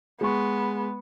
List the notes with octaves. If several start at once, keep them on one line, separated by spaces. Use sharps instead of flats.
G#3 B3 C#6